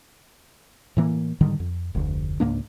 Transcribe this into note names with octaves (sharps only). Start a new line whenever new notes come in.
A2 E3 A#3
G#2 D3 D#3 G3
F2
F1 D2
C#2 G#2 A#3 D4